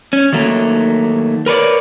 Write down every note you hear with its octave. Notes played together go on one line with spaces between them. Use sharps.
C#4
D#3 F#3 A3 A#3
A#4 B4 C#5 D5